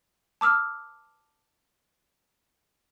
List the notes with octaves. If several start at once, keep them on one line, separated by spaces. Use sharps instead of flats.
A5 D6 E6 F6